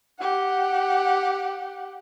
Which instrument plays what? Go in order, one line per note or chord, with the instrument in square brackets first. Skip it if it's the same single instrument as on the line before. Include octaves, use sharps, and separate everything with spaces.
[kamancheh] G4 F#5